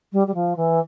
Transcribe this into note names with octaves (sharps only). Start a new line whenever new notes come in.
G3
G3
F3
E3